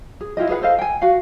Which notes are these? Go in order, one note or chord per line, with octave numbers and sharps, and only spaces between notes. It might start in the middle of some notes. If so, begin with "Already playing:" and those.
G#4
E4 F4 G4 D#5
G#4 B4 F5 F#5
A4 C5 D#5 F5
G5 G#5
F#4 F5